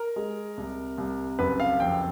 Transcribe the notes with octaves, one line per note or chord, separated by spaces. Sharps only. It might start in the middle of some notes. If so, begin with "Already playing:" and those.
Already playing: A#4
G#3
C2
C2
F#1 B4
F5
F2 G5